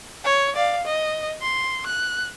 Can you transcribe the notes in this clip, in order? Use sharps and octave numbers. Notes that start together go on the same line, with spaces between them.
C#5
D5 F5
D#5
C6
F#6